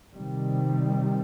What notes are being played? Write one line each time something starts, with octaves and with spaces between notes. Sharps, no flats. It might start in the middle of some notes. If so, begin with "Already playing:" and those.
C3 D#3 G3